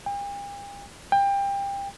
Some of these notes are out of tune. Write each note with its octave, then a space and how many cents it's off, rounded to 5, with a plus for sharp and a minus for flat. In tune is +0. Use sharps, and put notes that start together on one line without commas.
G5 +45
G5 +25